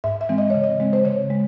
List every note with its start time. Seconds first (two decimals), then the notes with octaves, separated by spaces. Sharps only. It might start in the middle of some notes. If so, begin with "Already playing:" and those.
0.04 G#2 E5
0.21 E5
0.29 E3 G#3 C4
0.38 D#5
0.50 C#3 C#5
0.64 D#5
0.80 G#3 C4
0.93 C5
1.05 C#3 C#5
1.30 G#3